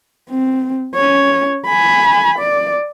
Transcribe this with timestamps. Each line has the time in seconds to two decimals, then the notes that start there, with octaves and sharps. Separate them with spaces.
0.30 C4
0.95 C#4 C#5
1.66 G#5 B5
2.39 D5